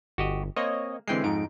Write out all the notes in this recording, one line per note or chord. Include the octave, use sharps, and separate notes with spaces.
G1 F#4 G4 D#5
A#3 C4 C#5 D#5
D3 E3 G#3 C4 G5 C7
F2 G#2 D#4 D7